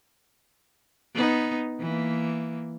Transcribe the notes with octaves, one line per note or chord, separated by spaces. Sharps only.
B3 D#4
E3 A#3